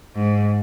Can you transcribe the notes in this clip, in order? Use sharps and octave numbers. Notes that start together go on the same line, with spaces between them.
G#2